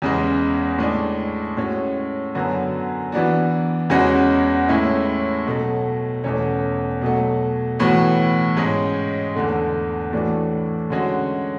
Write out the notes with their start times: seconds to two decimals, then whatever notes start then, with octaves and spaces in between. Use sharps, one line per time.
0.02 E2 C#3 G#3
0.78 A2 G#3 D4
1.57 A2 G#3 C#4 F#4
2.34 F#2 D3 F#3 B3 F#4
3.12 E3 B3 D4 F#4
3.90 E2 C#3 G#3 C#4 F#4
4.68 A2 G#3 C#4 E4
5.47 B2 F#3 A3
6.24 E2 B2 A3 C#4
7.01 B2 F#3 A3
7.79 A2 E3 B3 F#4
8.57 G#2 G#3 C#4
9.36 E2 D3 A3
10.13 A2 E3 A3 D4 F#4
10.90 D3 G#3 C#4 F#4